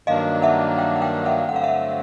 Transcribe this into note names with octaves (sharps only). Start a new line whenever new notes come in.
G2 D#3 F#3 A#3 D4 D#5 F5
E5 F#5
F5 G5
F#5
F5 G5
E5 F#5
G2 D3 F#3 A3 C4 F#5
F5
E5 F#5